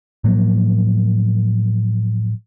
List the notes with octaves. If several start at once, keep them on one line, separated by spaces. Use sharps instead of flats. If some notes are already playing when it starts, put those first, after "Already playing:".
A2 F3 F#3 A#3